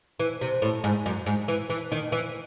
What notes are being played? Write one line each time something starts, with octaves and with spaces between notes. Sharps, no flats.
E3
C3
A2
G#2
F#2
G#2
E3
E3
D#3
E3